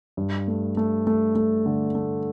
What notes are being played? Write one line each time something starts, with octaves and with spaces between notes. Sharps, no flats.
G2
A3
A3
A3
A3
D3
A3